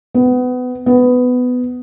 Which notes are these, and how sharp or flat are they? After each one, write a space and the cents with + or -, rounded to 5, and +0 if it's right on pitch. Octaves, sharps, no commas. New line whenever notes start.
B3 +25
B3 +15